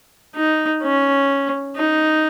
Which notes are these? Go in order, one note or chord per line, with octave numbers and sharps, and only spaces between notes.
D#4
C#4
D#4